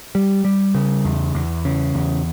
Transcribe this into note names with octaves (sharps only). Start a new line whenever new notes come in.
G3
G3
C#3
E2
E2
C#3
E2